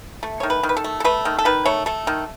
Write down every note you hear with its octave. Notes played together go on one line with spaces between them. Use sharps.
A3
D#3 C#5
B4
D#3
B4
A4
A3
A4
A3 B4
D#3
A4
D#3 B4
A3 C#5
A3 A4
D#3